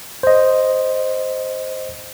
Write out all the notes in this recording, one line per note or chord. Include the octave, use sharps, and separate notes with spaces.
C5 D#5